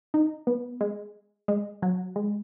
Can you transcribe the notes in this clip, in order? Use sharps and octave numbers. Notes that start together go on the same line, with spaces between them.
D#4
B3
G#3
G#3
F#3
G#3